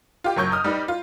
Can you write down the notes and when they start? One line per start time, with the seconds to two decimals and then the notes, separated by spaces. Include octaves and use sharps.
0.24 F4 G4
0.36 F#1 F#3 C#6 G6
0.52 D#6 F6
0.64 G3 D#4 B4
0.88 F4